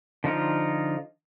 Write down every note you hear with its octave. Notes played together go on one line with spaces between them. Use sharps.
D3 F3 D#4 F4